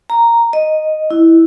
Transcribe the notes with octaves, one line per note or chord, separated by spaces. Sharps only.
A#5
D#5
E4